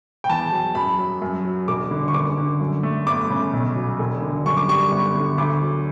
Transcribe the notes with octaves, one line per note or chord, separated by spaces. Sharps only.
G5
E2 A5
F#3
F#2 B5
F#3
F#2
F#3
E1 D6
D3
C#6
F#1 D6
D3
F#2
A3
G1 D6
C#3
B1
F#3
E1
D3
F#2 C#6
D6
G3 C#6
G1
D3
D2 D6
F#3